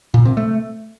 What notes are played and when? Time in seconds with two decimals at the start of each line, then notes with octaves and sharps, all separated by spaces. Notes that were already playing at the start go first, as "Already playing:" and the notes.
0.14 A#2
0.25 C3
0.37 A3